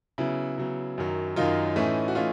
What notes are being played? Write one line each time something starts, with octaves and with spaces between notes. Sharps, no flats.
C#3 F#3 B3 E4
C#3 F#3 B3
F#2 D#3 F#3
F#2 D#3 F#3 D#4 F4
A2 E3 A3 C#4
F#4
E3 A3 C#4 D#4 F4